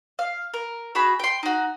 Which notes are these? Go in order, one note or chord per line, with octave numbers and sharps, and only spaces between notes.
F5
A#4
F#4 G#4 B5
G5 C6
D#4 F#4